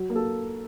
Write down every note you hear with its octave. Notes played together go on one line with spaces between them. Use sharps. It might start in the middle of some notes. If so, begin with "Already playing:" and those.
Already playing: F#3
A#3
A4